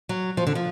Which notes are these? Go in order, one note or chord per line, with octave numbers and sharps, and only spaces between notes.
F#3
F3
D3
F3